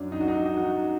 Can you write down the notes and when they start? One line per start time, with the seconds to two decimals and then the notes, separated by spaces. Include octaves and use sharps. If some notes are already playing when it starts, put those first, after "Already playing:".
Already playing: F#2 F#3 D4
0.12 D#4
0.21 F#4
0.28 D#4
0.46 D#4
0.57 F#4